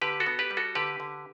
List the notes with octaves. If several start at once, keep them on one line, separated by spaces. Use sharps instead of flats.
D3 G4 B4
F#4 A4
B3
G4 B4
G3
F#4 A4
D3 G4 B4
D3